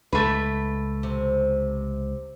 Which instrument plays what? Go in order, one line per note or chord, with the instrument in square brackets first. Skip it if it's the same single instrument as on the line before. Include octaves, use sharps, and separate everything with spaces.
[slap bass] C#2 [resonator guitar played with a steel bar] A3 B4
[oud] C3